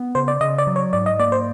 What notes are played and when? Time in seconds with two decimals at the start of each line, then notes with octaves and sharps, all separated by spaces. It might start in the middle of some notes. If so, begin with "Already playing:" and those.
Already playing: B3
0.15 C#3 C5
0.28 D5
0.41 C#3 D#5
0.58 D5
0.67 F#3
0.76 C#5
0.93 G#2 D5
1.06 D#5
1.19 A#3 D5
1.32 C5